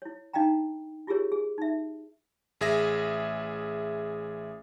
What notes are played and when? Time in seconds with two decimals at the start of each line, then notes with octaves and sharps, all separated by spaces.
0.02 E4 C#5
0.33 D4 D#4 D#5 F5 G5 A#5
1.07 E4 F4 G4 G#4 A#4 C#5
1.32 G#4
1.58 D#4 E5
2.61 A1 G#4 E5 A#6